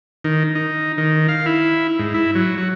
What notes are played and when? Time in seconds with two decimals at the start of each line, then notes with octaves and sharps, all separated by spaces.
0.24 D#3
0.55 D#4
0.98 D#3
1.28 F5
1.46 E4
1.99 G#2
2.14 E4
2.35 F#3
2.58 F#4